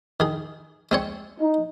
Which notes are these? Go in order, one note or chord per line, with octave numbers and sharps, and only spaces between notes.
D#3 G#4
G#3 C4 C#5
D#4